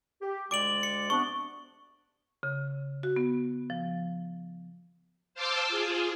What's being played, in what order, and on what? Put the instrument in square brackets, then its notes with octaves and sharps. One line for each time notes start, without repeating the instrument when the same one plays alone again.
[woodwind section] G4
[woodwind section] D2 G#3 D5 [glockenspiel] D6 D7 F#7
[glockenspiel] C#7
[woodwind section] C3 B3 D4 [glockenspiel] C#6
[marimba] C#3
F#4
B3
F3
[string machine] C5 F5 A5 C6 D6 E6
F4 G#4